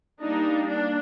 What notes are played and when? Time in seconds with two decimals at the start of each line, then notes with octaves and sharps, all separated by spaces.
0.20 G3 A#3 D4 D#4
0.68 D4